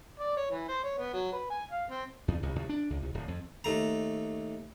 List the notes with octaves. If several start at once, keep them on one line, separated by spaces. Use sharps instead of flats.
D5
C#5
E3
C5
C#5
B3
F#3
B4
G#5
F5
C4
E2
C2
C2
D4
C#2
C2
D1
F2
D#2 A3 A#5